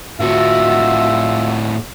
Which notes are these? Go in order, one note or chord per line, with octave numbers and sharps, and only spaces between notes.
A2 F4 F#4 E5